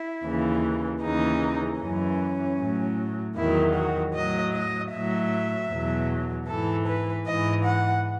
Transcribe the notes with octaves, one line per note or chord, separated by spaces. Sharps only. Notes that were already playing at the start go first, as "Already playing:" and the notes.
Already playing: E4
D#2 C#3 E3
D#2 C#3 E3 D#4
F#2 E3 C#4
A2 F#3
E2 D#3 F#3 E4
F#4
A2 F#3 D#5
D#5
A2 F#3 E5
E2 B2 F#3
G#2 E3 A4
B4
G#2 E3 D#5
F#5